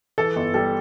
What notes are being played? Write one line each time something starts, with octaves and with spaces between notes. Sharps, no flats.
E3 A4
G1
G3 A4